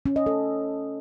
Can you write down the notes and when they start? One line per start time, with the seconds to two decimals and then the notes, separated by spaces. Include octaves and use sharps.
0.06 C#4
0.16 D#5
0.26 A4